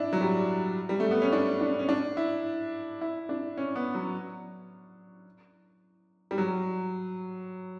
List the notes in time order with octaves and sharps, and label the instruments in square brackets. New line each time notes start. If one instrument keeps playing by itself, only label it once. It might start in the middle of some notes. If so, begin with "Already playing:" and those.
Already playing: [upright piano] D4 E4
F#3
G3
G3
A3
B3
C#4
D4
D4
C#4
D4
E4
E4
D4
C#4
B3
F#3
G3
F#3